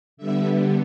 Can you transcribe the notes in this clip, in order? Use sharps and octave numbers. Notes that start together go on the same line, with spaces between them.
D3 G3 B3 E5